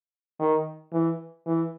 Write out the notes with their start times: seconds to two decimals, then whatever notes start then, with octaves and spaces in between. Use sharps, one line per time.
0.40 D#3
0.93 E3
1.46 E3